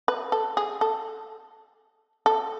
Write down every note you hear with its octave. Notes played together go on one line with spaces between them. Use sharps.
B4
A4
G#4
A4
A4